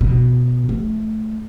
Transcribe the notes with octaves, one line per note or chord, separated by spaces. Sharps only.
B2
A3